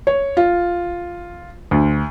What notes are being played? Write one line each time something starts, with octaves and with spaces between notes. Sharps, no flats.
C#5
F4
D2